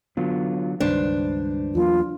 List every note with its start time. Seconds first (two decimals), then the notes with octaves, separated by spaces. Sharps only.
0.17 D3 F#3 B3 F4
0.80 C#2 G2 D#3 D4 B4 C5
1.75 E2 F#3 A#3 F4